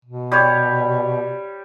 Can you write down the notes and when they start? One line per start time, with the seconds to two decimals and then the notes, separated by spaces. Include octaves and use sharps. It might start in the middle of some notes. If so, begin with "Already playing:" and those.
0.05 B2
0.32 G3 G4 C#5